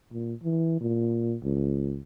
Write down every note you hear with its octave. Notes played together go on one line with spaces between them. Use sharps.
A#2
E3
A#2
C#2